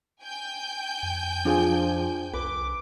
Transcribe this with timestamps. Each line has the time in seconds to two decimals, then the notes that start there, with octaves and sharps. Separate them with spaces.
0.21 G5 G#5 G6
1.03 F2
1.45 F3 D4 G#4
2.33 C2 B4 D6